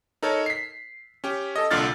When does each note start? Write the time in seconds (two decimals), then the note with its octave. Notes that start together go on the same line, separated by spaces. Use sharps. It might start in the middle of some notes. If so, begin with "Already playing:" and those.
0.23 D#4 A4 A#4 C#5
0.46 B6 C7
1.24 C#4 G4
1.56 A4 D#5
1.71 C2 A#2 D3 F6 A6